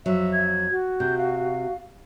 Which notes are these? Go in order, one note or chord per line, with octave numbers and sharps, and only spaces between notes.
F2 F#3 E5
G#6
F#4
C3 G6
F5